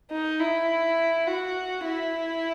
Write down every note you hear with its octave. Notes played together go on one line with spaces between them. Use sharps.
D#4
E4
F#4
E4